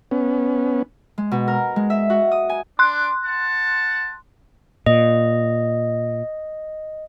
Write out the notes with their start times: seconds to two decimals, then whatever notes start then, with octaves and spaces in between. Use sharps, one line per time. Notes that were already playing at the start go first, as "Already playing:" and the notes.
0.11 B3 C#4
1.18 G#3
1.31 B2
1.48 A#4
1.76 G#3
1.90 E5
2.10 F#4
2.32 D#6
2.49 G#5
2.79 D4 C6 D6 F#6
3.24 F#5 A5
4.86 A#2 D#5